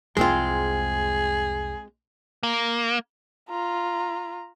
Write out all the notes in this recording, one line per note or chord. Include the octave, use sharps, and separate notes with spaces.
C2 F2 G#3 C4 F4 G#4
A#3
F4 A#5